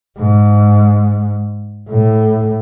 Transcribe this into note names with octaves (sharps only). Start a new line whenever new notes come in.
G#2
A2